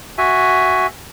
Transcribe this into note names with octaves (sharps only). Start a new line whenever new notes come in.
F#4 E5 G#5